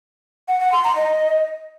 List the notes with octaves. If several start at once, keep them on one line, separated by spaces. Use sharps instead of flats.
F#5
F#5
C6
A#5
D#5